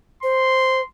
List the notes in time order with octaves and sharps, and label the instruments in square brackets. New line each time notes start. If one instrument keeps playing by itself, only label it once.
[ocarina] C5 [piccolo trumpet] C6